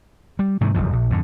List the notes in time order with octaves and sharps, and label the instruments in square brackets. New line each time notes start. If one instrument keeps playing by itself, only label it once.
[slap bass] G3
G#2 C3 D#3 E3
D#1 A1 F#2 F3
A#1
F2 G#2 D3